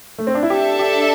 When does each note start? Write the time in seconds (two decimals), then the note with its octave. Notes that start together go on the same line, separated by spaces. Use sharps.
0.18 A3
0.27 C4
0.35 D4
0.43 E4
0.49 D4 G4 A4 E5 A5
0.79 G4